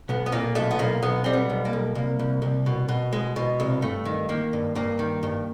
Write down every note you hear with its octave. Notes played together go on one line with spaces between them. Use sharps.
B1 B3
B3
A#2 A#3
B1 A3
B3
B1 A#3
B1 B3
G3 C4
B3
B1
A#3
B1
C2 A#3
C2
C2
B2
B2
G#3
B2
C2
G2 A3
D#3
D#3 A#3
G2
G2 A#3
D#3
G2